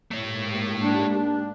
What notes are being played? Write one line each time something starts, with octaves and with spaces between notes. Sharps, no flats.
G#2 A3 A#3 G4 C#5
D4